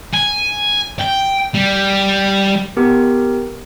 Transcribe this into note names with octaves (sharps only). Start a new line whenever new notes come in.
G#5
G5
G3
B3 G4 A#4